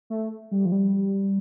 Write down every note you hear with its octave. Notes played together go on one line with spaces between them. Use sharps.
A3
G3
F3
G3